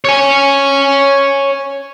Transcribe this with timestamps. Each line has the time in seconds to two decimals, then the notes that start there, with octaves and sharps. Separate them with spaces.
0.05 C#5 G#5